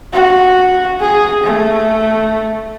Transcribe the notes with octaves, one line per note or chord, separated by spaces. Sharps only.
F#4
G#4
A3